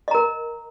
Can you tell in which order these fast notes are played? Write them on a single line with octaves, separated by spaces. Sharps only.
D#5 A#5 A#4